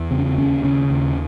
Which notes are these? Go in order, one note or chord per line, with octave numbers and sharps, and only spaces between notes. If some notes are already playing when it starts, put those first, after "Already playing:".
Already playing: E2
C#3 C4
C#4
C4
D#2 C#4
C#3 C#4
D#2